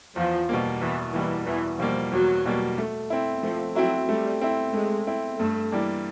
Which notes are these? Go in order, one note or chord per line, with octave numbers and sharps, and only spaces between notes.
E2 F3
B2 G3 A#3
E2 E3
B2 E3 G3 A#3
E2 E3
B2 F3 G3 A#3
E2 F#3
B2 G3 A#3
A3
C4 E4
F3 A3
F#3 C4 E4
G3 A3
C4 E4
G#3 A3
C4 E4
G2 A3
E3 G3 A#3 D4